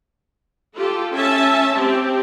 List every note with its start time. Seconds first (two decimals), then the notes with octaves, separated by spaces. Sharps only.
0.76 F4 G4 A4
1.15 C#4 E5 A5
1.76 C4 G4